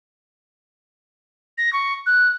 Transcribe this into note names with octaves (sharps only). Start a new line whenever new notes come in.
A#6
C#6
F#6